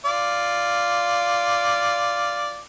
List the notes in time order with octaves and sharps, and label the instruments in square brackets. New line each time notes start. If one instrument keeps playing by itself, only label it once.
[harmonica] F4 D5